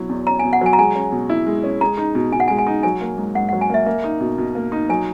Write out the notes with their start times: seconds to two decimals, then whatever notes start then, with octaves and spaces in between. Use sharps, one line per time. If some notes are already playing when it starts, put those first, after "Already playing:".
Already playing: B2 F#3 E4
0.09 E2
0.27 C#4 A#5
0.39 G#5
0.44 B2
0.53 F#5
0.61 F#3 G#5
0.73 A#5
0.78 G#3 G#5
0.95 C#4
1.12 B2
1.29 E4
1.47 G#3
1.64 C#4
1.81 G#3 A#5
1.98 D#4
2.15 B2
2.32 B2 G#5
2.40 F#5
2.48 G#3 G#5
2.58 G#5
2.67 D#4
2.83 F#3 G#5
3.01 A#3
3.18 G#2
3.35 G#2 F#5
3.49 F#5
3.53 F#3
3.61 G#5
3.70 A#3 E5
3.86 A#3
4.04 D#4
4.21 B2
4.38 B2
4.55 A#3
4.72 D#4
4.89 F#3 G#5